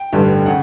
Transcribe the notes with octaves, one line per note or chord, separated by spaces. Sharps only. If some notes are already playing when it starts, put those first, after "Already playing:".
Already playing: G5
A1 G2 D3 G3
C#3 F#5